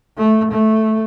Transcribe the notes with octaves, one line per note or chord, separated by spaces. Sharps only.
A3
A3